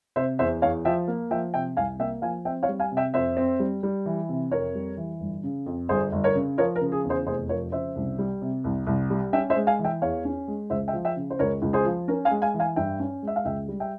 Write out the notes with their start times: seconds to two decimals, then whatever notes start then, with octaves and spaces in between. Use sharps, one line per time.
0.16 C3 C5 E5
0.39 E2 C5 E5
0.62 E2 C#5 F5
0.85 F3 E5 G5
1.08 A#3
1.31 F3 E5 G5
1.54 C3 E5 G5
1.77 C2 F5 G#5
1.99 A#3 E5 G5
2.22 F3 F5 G#5
2.45 C4 E5 G5
2.63 C#5 F5
2.69 G3
2.80 F5 G#5
2.92 C3
2.97 E5 G5
3.14 F2 C5 E5
3.37 C4
3.60 G3
3.83 G3
4.06 E3
4.29 C3
4.51 F2 A#4 C#5
4.75 G3
4.97 E3
5.20 G1
5.43 C#3
5.66 F2
5.89 G1 G#4 C5
6.12 G1
6.24 A#4 C#5
6.35 C#3
6.58 F3 A#4 C#5
6.76 A#4
6.81 C#3
6.92 G#4
7.04 E2
7.09 G#4 C5
7.26 F1 G#4 C5
7.49 F3 A#4 C#5
7.72 C#3 C5 E5
7.96 C2
8.19 G3
8.42 C3
8.64 C2
8.87 C2
9.10 G3
9.33 C#4 E5 G5
9.50 C5 E5
9.56 G#3
9.67 F5 G#5
9.79 E3
9.84 E5 G5
10.02 E2 C#5 F5
10.25 C#4
10.48 G#3
10.70 C#2 C5 E5
10.88 E5 G5
10.93 F3
11.05 E5 G5
11.16 C#3
11.30 C5
11.39 C#2 A#4 C#5
11.62 C#2
11.73 G#4 C5
11.85 F3
12.08 C#4 A#4
12.25 F5 G#5
12.31 G#3
12.42 F5 G#5
12.54 E3
12.60 F5 G#5
12.76 G2 E5 G5
12.99 C#4
13.23 G#3 E5
13.36 F5
13.45 C#2 E5 G5
13.68 G3
13.80 E5 G5